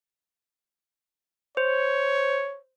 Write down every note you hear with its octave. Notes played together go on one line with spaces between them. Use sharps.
C5 C#5